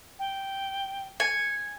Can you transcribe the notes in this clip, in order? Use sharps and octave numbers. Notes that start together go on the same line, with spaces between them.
G5
G#5 C#7